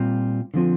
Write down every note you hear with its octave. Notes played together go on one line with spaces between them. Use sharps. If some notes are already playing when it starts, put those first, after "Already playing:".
Already playing: A#2 G3 C4 F4
D3 F3 C4 F4